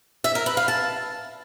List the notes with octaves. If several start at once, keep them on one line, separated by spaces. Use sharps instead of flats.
E5
A#4
B4
F5
A5